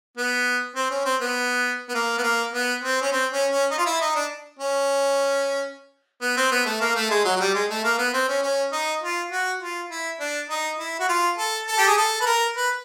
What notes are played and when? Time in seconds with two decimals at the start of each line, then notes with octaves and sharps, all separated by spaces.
0.17 B3
0.75 C4
0.90 C#4
1.05 C4
1.21 B3
1.89 B3
1.94 A#3
2.18 B3
2.23 A#3
2.53 B3
2.83 C4
3.02 C#4
3.12 C4
3.32 C#4
3.51 C#4
3.71 D#4
3.78 F4
3.86 E4
4.01 D#4
4.15 D4
4.59 C#4
6.21 B3
6.37 C4
6.51 B3
6.65 A3
6.80 A#3
6.95 A3
7.10 G#3
7.25 F#3
7.36 F#3
7.40 G3
7.54 G#3
7.70 A3
7.84 A#3
7.98 B3
8.13 C4
8.28 C#4
8.42 C#4
8.72 D#4
9.02 F4
9.31 F#4
9.61 F4
9.90 E4
10.20 D4
10.50 D#4
10.78 E4
10.99 F#4
11.09 F4
11.38 A4
11.67 A4
11.78 G4
11.87 G#4
11.97 A4
12.21 B4
12.26 A#4
12.56 B4